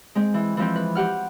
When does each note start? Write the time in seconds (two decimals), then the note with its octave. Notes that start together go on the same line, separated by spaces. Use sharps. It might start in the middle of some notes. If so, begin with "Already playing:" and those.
0.15 G#3 C4
0.34 E3
0.57 E3 F3 C4
0.76 B4
0.95 G4 F#5 F6